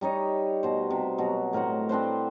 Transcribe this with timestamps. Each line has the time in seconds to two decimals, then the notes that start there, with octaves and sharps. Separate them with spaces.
0.01 G3 D#4 C#5 D#5
0.63 B2 C5
0.90 C3
1.18 B2 F#3 F#4
1.53 A2 A#4 C5 F#5
1.89 C4 D4 B4 C5